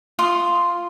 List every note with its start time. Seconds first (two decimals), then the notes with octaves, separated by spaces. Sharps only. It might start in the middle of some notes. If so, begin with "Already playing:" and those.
0.19 F4 C6 D#6